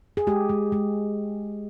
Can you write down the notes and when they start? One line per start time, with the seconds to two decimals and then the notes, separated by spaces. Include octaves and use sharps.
0.17 G#4
0.27 G#3 G4
0.49 G#3
0.72 G#3